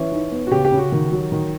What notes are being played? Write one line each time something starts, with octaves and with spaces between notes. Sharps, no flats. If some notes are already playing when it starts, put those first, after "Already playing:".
Already playing: E3 C#4
D#4
B3
F#4
C#3 G4
G4
C#3
F#4
D#3
F#3
D#3